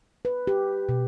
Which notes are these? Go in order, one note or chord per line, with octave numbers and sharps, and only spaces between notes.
B4
G4
B2